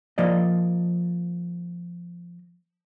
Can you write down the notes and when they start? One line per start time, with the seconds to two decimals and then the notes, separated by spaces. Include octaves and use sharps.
0.18 F3 A#3 D5 D#5